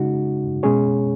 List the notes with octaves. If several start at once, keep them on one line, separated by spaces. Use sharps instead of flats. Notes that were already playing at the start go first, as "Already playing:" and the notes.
Already playing: C#3 G#3 D#4 F#4
B2 G#3 C#4 G#4 C#5